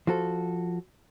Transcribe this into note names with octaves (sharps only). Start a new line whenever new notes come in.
F3 F#4 A4